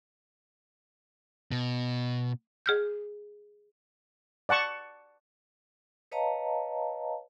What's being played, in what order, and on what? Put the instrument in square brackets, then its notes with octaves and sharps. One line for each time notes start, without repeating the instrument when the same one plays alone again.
[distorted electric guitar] B2
[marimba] G#4 F6 G6
[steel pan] D5 F#5 A5 C#6
[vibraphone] B4 C#5 D#5 F5 A5 A#5